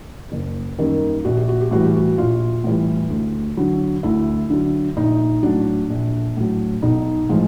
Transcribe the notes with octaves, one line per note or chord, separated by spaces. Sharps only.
F#1
F#2 D#3 G3 A#3
A#1 F#4
G4
F#4
G4
A2 E3 G3 F#4
G4
F#4
A#1 F4
A2 E3 G3
D2
D3 F#3
D2 E4
D3 F#3
A#1 D#4
A2 F#3 D4
A#1
A2 F#3
B1 D#4
A2 F3 G#3 F4